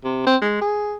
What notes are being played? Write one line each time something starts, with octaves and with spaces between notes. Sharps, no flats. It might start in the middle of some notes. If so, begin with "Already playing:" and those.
C3
C4
G#3
G#4